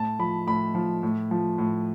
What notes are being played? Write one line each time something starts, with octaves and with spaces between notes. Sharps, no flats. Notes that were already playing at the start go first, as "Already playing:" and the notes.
Already playing: A2 A5
F3 B5
A2 B5
F3
A2
F3
A2